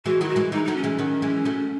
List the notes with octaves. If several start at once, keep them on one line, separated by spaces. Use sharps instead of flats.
E3 G#3 F#4
D#3 F#3 E4
F#4
E3 G#3
E3 G#3 D#4
F#3 A3 D#4
C#4
E3 G#3
D#3 F#3
E3 G#3
F#3 A3